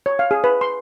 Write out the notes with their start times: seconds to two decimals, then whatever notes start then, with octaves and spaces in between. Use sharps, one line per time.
0.06 C#5
0.19 F5
0.31 G#4
0.44 B4
0.61 C6